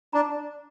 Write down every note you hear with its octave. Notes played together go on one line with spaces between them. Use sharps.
D4 A#5